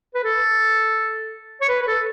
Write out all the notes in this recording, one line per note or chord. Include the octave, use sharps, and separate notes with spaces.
B4
A4
C#5
B4
B4
A4